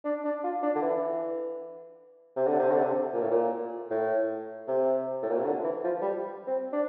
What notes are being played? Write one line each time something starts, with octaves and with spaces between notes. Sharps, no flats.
D4
D4
F4
D4
D3
E3
C3
D3
C3
D3
C3
A#2
A2
A#2
A2
C3
A2
A#2
C3
D3
E3
F3
G3
C4
D4